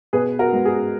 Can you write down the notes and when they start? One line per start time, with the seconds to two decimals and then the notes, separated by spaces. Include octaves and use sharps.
0.13 B2 G#4 B4
0.39 F#4 A#4
0.53 G#3 B3
0.65 G#4